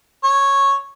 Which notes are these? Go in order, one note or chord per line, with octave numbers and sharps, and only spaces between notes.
C#5